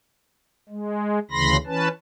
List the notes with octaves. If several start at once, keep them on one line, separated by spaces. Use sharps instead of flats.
G#3
D2 C#3 E3 B5 C6 A#6
E3 C#4 B4 A5